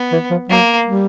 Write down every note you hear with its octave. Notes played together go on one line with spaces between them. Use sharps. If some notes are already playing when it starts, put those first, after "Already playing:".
Already playing: B3
E3
F3
F#3 A#3
G3